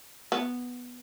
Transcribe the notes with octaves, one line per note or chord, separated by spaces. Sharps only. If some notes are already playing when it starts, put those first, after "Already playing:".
B3